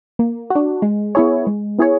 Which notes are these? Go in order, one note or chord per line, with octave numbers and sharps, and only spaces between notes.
A#3
D4 F#4
G#3
B3 E4 G#4 C#5
G#3
B3 E4 G#4 C#5